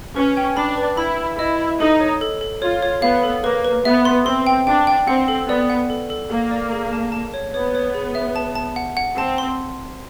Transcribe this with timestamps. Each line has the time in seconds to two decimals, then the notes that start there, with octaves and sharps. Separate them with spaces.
0.16 C#4 B4
0.37 G5
0.57 D4 B5
0.78 B4
0.97 E4 B5
1.18 B5
1.39 E4 D#5
1.60 B5
1.80 D#4 A4
2.00 C#5
2.21 A4
2.41 A4
2.62 F4 C#5
2.82 C#5
3.02 B3 F5
3.24 A4
3.44 A#3 B4
3.65 B4
3.84 B3 E5
4.05 C6
4.26 C4 C6
4.47 G5
4.67 D4 G5
4.87 G5
5.08 C4 F#5
5.28 A4
5.48 B3 D5
5.70 F#5
5.90 A4
6.10 A4
6.30 A#3 A4
6.51 D5
6.72 G#4
6.93 A5
7.12 A5
7.34 C#5
7.54 B3 C#5
7.75 C#5
7.94 G#4
8.15 E5
8.36 A5
8.55 A5
8.76 F#5
8.97 F#5
9.18 C4 A5
9.38 C6